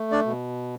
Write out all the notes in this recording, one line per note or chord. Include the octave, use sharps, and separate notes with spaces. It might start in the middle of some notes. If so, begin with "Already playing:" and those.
Already playing: A3
D4 D5
B2